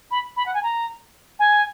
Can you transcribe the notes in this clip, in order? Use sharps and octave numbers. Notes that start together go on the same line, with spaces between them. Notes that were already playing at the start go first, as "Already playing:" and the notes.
B5
B5
F#5
G#5
A#5
G#5